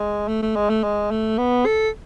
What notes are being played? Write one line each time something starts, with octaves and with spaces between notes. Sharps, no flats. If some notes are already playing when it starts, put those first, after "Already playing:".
Already playing: G#3
A3
A3
G#3
A3
G#3
A3
B3
A4